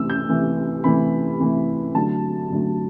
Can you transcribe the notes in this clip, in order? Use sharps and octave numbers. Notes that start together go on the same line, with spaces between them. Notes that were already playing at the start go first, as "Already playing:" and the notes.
Already playing: C3 E3 A3 E6
G6
C3 E3 A3
C3 E3 A3 B5
C3 E3 A3
D3 F#3 A3 A5
D3 F#3 A3